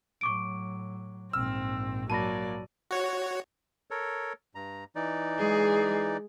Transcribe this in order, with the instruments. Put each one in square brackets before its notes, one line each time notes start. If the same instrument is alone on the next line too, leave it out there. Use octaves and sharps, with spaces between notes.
[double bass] A2 F#3 [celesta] C#6 D6 D7
[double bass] A#1 G#2 [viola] C4 [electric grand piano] E6 [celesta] F6
[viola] F#3 D5 [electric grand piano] A#3 D#7 [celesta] A5 B5 A#6
[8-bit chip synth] F#4 C#5
[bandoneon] A4 A#4 C#5
G2 A#5
E3 D#4 D5
[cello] G#3 G#4